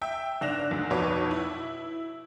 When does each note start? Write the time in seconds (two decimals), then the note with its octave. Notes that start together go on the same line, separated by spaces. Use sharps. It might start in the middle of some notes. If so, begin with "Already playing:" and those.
0.01 E5 G5 E6
0.41 G1 D4 F#6 A#6 E7 F7
0.71 D2 D3
0.90 B1 F2 B2 B4 C#5 D6
1.31 E4